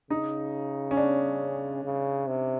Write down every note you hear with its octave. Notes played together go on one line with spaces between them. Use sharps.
C#3 D#4
C#4
D4
C#3
C3